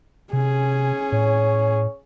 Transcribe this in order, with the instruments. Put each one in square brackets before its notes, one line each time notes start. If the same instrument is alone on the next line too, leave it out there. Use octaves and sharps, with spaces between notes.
[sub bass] C3 [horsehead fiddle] C#4 G#4
[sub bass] A2 [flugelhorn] C#5